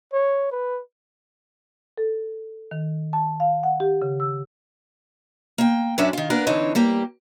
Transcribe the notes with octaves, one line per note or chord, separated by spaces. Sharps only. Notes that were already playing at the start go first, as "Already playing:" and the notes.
C#5
B4
A4
D#3
A5
F5
F#5
G4
C#3
E6
A#3 G5
F#2 C#4 D4 F#4 D5 E5
D#3 F4
A#3 B3 D4 A#4
D3 E3 C4 D4 D#4 C#5
G3 A#3 G4